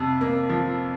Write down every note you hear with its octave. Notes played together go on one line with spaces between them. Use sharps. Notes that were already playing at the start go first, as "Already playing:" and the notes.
Already playing: F2 C3
A#3
F3